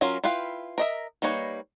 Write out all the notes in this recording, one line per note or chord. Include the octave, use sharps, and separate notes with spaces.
F#3 C#4 F4 A#4 F5
E4 F4 B4 F5 G5
A#4 D#5 E5
G3 A#3 D#4 B4 C#5